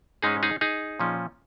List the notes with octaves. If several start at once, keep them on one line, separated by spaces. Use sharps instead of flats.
G#2 G#3 C#4 D#4 G#4
D#4 G#4
D#4 G#4
A#2 F3 C#4